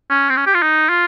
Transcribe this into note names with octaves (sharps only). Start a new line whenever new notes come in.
C#4
C4
C#4
G4
F4
D#4
F4